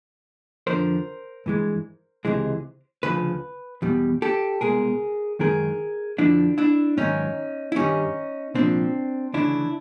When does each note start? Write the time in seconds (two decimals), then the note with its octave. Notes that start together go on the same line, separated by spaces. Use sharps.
0.67 F2 D3 F3 A#4 C5
1.46 G2 E3 G#3
2.25 C#2 C3 E3 G#3
3.03 D2 C#3 F3 B4
3.82 E2 B2 G3
4.22 G4 A4
4.61 C2 B2 G#3 G#4 A#4
5.39 F#2 D#3 G#3 G#4 A#4
6.18 F2 D3 F3 D4 E4
6.58 D4 E4
6.97 G#2 D#3 F#3 C#4 D#4
7.72 E4
7.76 G2 D#3 G3 C#4 D#4
8.55 C2 A#2 F3 C4 D4
9.33 D2 C#3 E3 D4 E4